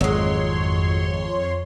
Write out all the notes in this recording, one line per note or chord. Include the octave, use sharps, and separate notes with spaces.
G#1 F2 F#3 G#3 C#5 C6